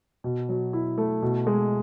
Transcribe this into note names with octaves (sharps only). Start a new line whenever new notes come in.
B2
F#3
E4
A3
B2
G#3